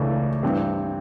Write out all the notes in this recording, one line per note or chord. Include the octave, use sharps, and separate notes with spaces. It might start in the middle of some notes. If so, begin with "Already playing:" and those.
Already playing: C#2 C#3 E3 A3 D4
G2 E3 G3 C4